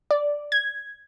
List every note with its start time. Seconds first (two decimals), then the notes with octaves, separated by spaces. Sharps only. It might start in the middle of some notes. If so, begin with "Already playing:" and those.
0.11 D5
0.52 G#6